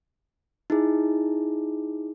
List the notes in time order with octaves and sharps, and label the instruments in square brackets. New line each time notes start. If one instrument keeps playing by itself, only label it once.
[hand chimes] D#4 E4 G#4